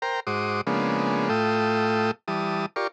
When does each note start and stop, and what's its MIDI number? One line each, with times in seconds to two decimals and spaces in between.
0.02 0.20 70
0.02 0.20 72
0.02 0.20 79
0.02 0.20 82
0.27 0.61 44
0.27 0.61 66
0.27 0.61 72
0.27 0.61 86
0.27 0.61 87
0.67 1.29 49
0.67 1.29 53
0.67 1.29 56
0.67 1.29 58
0.67 1.29 59
0.67 1.29 62
1.29 2.11 45
1.29 2.11 57
1.29 2.11 65
1.29 2.11 69
1.29 2.11 79
1.29 2.11 87
2.28 2.66 52
2.28 2.66 55
2.28 2.66 81
2.28 2.66 87
2.76 2.87 65
2.76 2.87 67
2.76 2.87 70
2.76 2.87 74
2.76 2.87 85